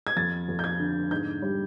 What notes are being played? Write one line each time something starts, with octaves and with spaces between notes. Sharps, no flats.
G#6
F2 A6
F2
G6
G#6
D3
G#2 G6
G3